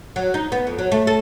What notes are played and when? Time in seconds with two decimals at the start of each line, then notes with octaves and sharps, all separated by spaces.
0.16 F#3
0.34 D#4
0.52 B3
0.67 F2
0.78 F#3
0.92 A3
1.07 A4